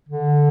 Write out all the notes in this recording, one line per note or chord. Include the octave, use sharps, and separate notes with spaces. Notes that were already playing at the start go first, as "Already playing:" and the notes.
D3